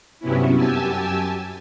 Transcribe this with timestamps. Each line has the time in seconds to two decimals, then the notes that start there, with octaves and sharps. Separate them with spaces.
0.20 G2 C3 F#3 B3 C#4 E4
0.54 F#2 G4 G#5 A5 E6